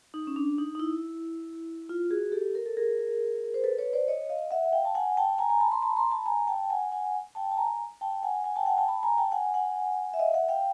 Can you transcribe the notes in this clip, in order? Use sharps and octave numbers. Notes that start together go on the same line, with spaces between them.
D#4
C#4
D4
D#4
D#4
E4
F4
F#4 G#4
G4 A4
A#4
A4
G#4 A#4
C5
A4 B4
B4 C#5
C5 D5
C#5 D#5
D#5 F5
E5 F#5
F5 G5
A5
F#5 G#5
G5 A5
G#5 A#5
G#5 A#5
A5 B5
A#5 C6
A5 B5
A#5 C6
A5 B5
G#5 A#5
G5 A5
F#5 G#5
F#5 G#5
G5 A5
A5
G#5 A#5
G5 A5
F#5 G#5
F#5 G#5
G5 A5
F#5 G#5
G5 A5
A5 B5
G#5 A#5
G5 A5
F#5 G#5
F#5 G#5
E5
D#5 F5
E5 F#5
F5 G5